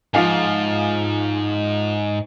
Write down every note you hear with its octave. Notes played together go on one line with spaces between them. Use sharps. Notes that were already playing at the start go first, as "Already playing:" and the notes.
G#2 F3 F5 G#5